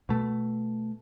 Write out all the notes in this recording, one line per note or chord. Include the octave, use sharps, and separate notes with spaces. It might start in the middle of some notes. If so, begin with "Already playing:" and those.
B2 A3